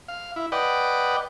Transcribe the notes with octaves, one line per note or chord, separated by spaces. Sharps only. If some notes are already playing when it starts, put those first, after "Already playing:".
F5
E4
B4 D5 D#5 F#5 G5